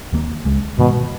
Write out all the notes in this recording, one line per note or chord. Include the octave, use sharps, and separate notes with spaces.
D#2 D#3 A#3
C#2 C#3 G#3
G#2 B2 D#3 G#3